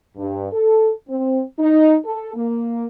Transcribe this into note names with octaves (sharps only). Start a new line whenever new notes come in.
G2
A4
C4
D#4
A4
A#3